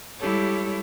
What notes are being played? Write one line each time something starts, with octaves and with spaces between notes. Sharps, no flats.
G3 G#3 E4 G4 A4 C#5